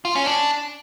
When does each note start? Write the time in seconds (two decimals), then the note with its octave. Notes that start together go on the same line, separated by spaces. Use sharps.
0.05 F4
0.15 C#4
0.26 D4